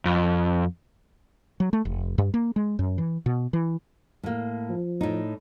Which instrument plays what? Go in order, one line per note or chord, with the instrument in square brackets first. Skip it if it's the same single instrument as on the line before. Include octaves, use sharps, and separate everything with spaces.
[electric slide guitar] F2
[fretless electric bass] F#3
A3
F1
G2
A#3
G#3
F#2
E3
B2
E3
[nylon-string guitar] A2 A#3
[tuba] F3
[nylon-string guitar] A2 D#4